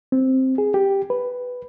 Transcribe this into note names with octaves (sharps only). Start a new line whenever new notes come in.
C4
G#4
G4
B4